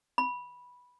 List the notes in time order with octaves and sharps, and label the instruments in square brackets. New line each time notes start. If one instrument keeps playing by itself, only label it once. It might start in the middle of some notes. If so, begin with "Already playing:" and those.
[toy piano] B5